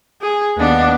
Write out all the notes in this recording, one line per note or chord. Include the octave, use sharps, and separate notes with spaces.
G#4
D#2 B3 D4